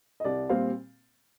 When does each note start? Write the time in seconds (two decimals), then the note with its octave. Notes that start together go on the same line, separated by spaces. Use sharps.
0.20 D#5
0.24 C2 D5
0.49 A#2 G3 C4 F5